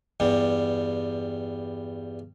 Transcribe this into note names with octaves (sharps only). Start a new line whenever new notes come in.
E2 G2 G3